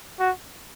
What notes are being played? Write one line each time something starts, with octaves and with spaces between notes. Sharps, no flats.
F#4